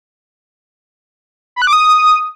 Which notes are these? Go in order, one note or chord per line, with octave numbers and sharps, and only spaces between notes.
B5
F#6
D6
D#6